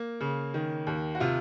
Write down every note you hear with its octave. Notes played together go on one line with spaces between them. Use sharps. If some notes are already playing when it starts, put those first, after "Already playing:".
Already playing: A#3
C#3
D#3
D#2
F#4
C3 F4